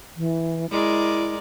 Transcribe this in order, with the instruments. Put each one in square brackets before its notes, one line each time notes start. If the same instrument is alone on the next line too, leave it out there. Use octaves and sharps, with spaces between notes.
[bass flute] E3
[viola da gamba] G#3 A#4 D5 [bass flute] E4